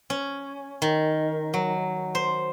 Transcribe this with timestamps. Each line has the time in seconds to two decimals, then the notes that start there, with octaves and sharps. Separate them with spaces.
0.10 C#4
0.82 D#3
1.54 F#3
2.15 C5